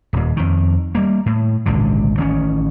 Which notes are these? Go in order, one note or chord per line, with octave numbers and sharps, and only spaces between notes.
D#1 D#2
F2 D#3
G3 A#3
A2
G#1 C#2 A#2 D3
A1 D#3 C4 C#4